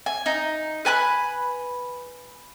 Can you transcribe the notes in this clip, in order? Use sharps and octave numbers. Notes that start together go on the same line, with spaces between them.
G#5
D#4
B4 G#5 B5 F#6